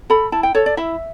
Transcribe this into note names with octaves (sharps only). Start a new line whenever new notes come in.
A4 B5
E4 A5
G5
A4 C#5
D5
E4 E5